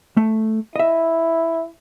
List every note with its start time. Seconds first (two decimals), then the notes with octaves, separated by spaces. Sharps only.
0.17 A3
0.76 E4 D#5 E5